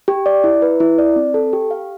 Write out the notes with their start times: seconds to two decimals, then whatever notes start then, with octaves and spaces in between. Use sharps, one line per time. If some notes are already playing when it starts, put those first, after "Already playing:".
0.08 G4
0.26 D5
0.44 E4
0.62 B4
0.80 E4
0.98 D5
1.16 C4
1.34 A4
1.53 G4
1.71 F5